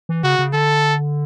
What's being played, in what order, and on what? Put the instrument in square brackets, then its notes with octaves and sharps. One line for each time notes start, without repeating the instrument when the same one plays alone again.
[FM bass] E3
[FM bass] C#3 [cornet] F#4
[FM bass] C#3
[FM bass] D3 [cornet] A4